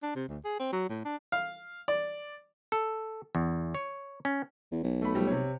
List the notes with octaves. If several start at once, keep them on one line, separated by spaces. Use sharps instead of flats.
D4
C3
D2
G#4
C4
F#3
A2
D4
F5
D5
A4
E2
C#5
C#4
E2
B1
A3 B5
F3 G3 A3
C3 C#5